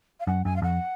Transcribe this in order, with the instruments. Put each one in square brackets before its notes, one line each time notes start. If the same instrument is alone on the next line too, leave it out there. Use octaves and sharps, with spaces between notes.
[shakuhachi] F5
[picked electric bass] F#2 [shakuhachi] F#5
[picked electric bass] F#2 [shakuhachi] G#5
[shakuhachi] F5
[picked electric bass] F2 [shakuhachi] F#5